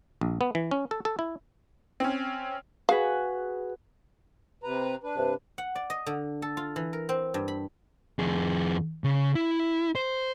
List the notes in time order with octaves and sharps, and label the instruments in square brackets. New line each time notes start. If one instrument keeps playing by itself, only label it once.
[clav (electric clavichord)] A#1
B3
E3
C#4
A4
A4
E4
[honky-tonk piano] C4 C#4
[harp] F#4 G#4 B4 [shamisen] F5
[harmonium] C3 B4 A#5
D4 B4
[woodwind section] G2 C3
[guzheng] F#5
D5
D#5
D3
A4
F4
E3
A#4
C4
G2
B5
[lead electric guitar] F2 G#4
C#3
E4
C5